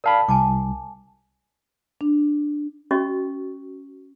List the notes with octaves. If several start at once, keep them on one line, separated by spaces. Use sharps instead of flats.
A#4 D5 F5 A5 B5
C2 G#5 A5 D6
D4
C#4 F#4 D#5 C#6